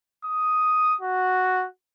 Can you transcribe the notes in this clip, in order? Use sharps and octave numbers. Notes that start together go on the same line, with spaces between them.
D#6
F#4